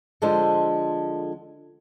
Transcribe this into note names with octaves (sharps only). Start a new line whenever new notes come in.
D3 F3 G#3 D4 A4 C5